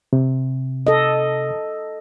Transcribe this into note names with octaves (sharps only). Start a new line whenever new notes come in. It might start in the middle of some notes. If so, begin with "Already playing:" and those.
C3
A4 D#5